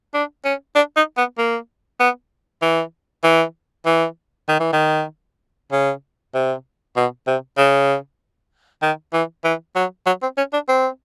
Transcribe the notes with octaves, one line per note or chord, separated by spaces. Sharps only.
D4
C#4
D4
D#4
B3
A#3
B3
E3
E3
E3
D#3
E3
D#3
C#3
C3
B2
C3
C#3
D#3
E3
E3
F#3
F#3
C4
C#4
D4
C4